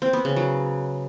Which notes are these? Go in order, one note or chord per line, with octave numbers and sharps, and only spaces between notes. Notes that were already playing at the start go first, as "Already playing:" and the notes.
C4
B3
C#3
F#3